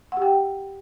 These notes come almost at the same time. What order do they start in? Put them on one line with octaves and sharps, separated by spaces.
F#5 G4 G5